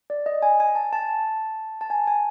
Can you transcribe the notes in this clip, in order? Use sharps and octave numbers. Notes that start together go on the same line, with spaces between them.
D5
D#5
G#5
G#5
A5
A5
A5
G#5
G#5